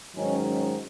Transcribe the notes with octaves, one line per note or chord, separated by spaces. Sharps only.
G#2 D#3 F#3 C#4
C#4